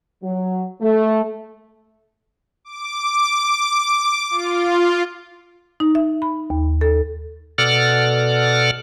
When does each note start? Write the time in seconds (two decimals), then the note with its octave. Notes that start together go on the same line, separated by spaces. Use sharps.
0.23 F#3
0.82 A3
2.65 D6
4.30 F4
5.80 D#4
5.95 E5
6.22 B5
6.50 D#2
6.81 A4
7.58 B2 A4 D5 F#5 F6